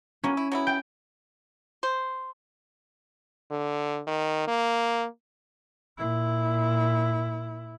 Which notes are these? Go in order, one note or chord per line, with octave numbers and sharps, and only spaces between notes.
E3 F#3 A#3 C#4
E4
F#3 B3 E4
G5
C5
D3
D#3
A#3
A#2 E4